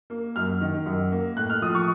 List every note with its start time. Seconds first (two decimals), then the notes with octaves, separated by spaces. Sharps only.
0.10 A#3
0.36 F#2 F6
0.61 D#3
0.86 F#2
1.12 A#3
1.37 A2 F#6
1.50 F6
1.62 F3 D#6
1.75 C#6